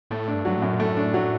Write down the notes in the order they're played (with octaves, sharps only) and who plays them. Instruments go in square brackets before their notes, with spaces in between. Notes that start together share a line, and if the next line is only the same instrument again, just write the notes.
[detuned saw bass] A2 [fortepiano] A3
[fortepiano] D4
[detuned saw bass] G2
[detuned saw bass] G2 [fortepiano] F#3
[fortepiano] F#2 [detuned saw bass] A2
[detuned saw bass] A#2
[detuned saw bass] A2 [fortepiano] A3
[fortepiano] D4
F#3